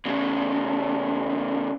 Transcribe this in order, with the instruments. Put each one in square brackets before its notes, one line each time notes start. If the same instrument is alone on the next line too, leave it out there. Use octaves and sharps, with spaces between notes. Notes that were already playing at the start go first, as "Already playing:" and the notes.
[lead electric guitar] E2 C#3